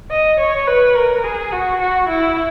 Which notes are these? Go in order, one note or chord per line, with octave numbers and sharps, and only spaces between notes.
D#5
C#5
B4
A#4
G#4
F#4
F#4
E4